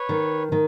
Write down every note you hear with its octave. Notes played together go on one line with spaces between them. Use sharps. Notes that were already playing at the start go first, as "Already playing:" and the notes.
Already playing: B4 C#5
D#3
D#3